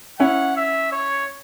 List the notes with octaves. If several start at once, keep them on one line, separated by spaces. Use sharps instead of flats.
C#4 E4 F#5
E5
C#5